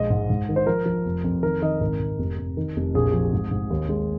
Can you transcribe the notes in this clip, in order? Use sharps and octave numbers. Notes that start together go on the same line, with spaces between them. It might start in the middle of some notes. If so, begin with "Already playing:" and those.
Already playing: A#1 G#3 D#5
G#2
G#2
D#3
C5
F3 A#4
F3
F1
F2
D#3 A#4
D#3 D#5
G#1 A#4
G#1
F1
F1
D#3
F1
A#1 G#4
F3
G#2
G#2
D#2
G#3